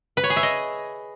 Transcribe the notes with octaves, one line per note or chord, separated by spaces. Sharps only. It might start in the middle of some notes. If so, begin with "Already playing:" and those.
B4
C#5
G#4
E5
D#5